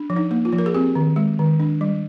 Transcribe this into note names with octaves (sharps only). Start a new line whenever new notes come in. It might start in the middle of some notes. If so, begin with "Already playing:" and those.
Already playing: D4
F3
D#4
A#3
F4
F3
A#4
G#4
C4 G4
D#3
G#3
D#3
D4
G3